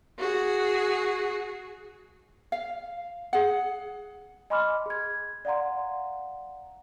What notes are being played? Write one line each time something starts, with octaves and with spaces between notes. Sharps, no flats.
F#4 G#4
F5
G#4 F#5
D#5 G#5 B5 C6 D6 F6
G#4 G#6
D5 F5 F#5 A#5 C6